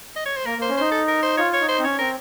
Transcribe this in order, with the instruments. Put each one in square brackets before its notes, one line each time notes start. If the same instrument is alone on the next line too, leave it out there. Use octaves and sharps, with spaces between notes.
[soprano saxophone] D#5
C#5
C5
[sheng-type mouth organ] A#3 [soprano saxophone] A#4
[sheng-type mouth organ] A#3 [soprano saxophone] C5
[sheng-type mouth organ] C#4
[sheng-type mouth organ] D#4 [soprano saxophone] C5
[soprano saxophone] A4
A#4
C5
[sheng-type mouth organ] F4 [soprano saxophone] C#5
[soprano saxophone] C#5
[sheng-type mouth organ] D#4
[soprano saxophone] C5
[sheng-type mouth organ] C4
[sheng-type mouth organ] C#4 [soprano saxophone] C#5
[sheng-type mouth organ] C4 [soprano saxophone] A#4